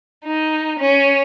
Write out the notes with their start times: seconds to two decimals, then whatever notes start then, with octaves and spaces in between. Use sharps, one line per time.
0.25 D#4
0.79 C#4